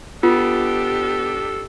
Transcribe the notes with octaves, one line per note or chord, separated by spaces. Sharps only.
B3 D4 F4 G4 A4